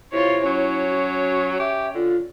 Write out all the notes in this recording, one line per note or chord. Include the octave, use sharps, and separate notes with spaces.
C3 E4 F4 C#5
F#3 C#4 C#5
F#4
G4 E5
D3 F4